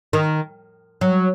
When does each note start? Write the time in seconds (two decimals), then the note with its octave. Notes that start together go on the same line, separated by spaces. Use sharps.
0.13 D#3
1.01 F#3